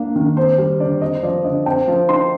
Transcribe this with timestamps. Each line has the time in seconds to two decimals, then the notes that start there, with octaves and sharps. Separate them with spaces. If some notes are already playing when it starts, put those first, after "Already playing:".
Already playing: A#3 D4
0.16 D#3
0.37 C4 C5
0.58 G3
0.79 D3 D5
1.01 C4 D#5
1.23 F3 D5
1.44 D3 D#5
1.66 C4 G5
1.88 F3 A5
2.09 D#4 C6